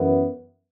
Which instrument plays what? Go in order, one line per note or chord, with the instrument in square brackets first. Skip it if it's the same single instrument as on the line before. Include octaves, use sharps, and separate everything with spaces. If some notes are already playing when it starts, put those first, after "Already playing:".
Already playing: [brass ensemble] F#2 E3 B3